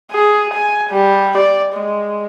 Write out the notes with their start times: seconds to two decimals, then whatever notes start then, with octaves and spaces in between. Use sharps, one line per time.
0.12 G#4
0.54 G#5
0.90 G3
1.38 D5
1.73 G#3